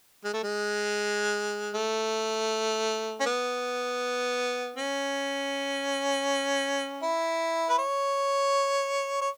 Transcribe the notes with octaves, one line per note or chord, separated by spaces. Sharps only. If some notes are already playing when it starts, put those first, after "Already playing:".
G#3
A3
G#3
A3
C#4
B3
C#4
E4
B4
C#5
C#5